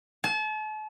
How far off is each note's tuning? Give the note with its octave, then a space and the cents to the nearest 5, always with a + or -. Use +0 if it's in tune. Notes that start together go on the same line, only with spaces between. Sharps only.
A5 -40